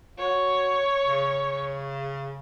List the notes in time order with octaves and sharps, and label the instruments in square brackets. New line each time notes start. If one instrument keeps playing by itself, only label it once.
[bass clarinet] F#4 [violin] C#5
[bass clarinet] C#3